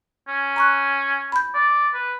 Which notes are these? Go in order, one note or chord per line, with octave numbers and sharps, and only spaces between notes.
C#4
A#5 C#6 F#6
B5 G6
D5
B4